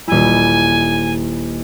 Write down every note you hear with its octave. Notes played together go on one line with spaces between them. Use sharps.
D#1 E4 G#5